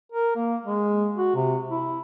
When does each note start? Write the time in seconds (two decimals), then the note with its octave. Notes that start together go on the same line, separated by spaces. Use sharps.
0.12 A#4
0.35 A#3
0.65 G#3
1.16 F#4
1.35 C3
1.71 E4